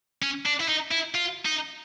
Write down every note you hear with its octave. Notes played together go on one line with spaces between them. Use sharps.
C#4
D4
E4
D#4
E4
F4
D#4